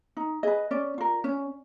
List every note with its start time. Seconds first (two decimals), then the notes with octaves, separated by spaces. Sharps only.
0.17 D#4
0.43 G#4 B4 D#5
0.71 C#4 D5
0.98 F4 A#4
1.24 C#4